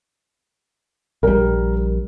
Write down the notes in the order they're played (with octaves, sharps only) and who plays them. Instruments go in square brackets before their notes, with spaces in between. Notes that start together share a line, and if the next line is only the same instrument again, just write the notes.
[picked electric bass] A#1 G3 [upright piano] A#4